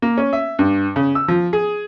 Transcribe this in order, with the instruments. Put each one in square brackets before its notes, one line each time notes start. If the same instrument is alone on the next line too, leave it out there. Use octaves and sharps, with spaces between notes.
[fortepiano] A#3
C#4
E5
G2
C#3
E6
F3
G#4